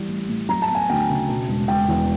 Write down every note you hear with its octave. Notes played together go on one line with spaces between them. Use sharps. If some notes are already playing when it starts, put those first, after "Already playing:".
Already playing: E3 G3
A1
A2
F#3 A#5
A5
B3
G#5
D2 G5
C#3
B2
E1
E1 G5
E2